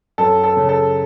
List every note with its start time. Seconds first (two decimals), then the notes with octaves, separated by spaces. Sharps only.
0.18 F#2 A4
0.44 A4
0.57 C#3
0.69 A4